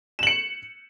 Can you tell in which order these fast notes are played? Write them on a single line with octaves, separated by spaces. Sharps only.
E7 F#7 C#7